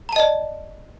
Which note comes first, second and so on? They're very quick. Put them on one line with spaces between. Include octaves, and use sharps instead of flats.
A#5 A5 D#5 D5